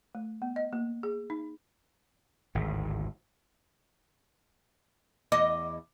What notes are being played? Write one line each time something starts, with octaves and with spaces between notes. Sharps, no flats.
A3
B3
D#5
A#3
G#4
D#4
G#1 D2 A2
E2 D#5 D6